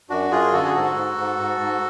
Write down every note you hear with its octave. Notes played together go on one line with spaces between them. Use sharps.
F#2 D4 F#4
F#2 F4 G#4
D3 F#4 A4
G#4
G#2 F#4 A4
G#2
G#2
G#2
G#2